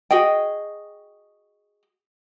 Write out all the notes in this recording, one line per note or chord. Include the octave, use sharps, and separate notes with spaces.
F#4 G#4 D#5 G5